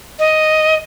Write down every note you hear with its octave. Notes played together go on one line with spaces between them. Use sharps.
D#5